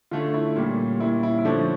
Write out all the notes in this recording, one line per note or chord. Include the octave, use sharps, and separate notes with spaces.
D3 A3 C#4 F4
E4
A#2 G3 A#3 C#4
A#2 G3 C#4 E4
E4
E4
D3 F3 A3 C#4 D4